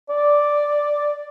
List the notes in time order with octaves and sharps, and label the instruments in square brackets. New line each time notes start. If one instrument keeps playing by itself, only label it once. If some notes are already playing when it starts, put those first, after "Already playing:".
[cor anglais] D5